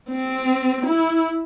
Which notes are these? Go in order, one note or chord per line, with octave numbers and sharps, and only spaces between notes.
C4
E4